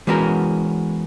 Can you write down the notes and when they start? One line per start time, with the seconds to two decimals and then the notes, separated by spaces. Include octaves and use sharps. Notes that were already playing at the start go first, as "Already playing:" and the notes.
0.07 E3 G#3 B3 C#4 F#4 A#4